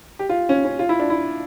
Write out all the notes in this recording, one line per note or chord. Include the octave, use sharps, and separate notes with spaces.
G4
F4
C#4
C#4
F4
E4
D4
E4